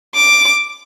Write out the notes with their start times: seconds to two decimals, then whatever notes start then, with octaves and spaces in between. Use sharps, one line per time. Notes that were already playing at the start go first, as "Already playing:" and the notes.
0.15 D6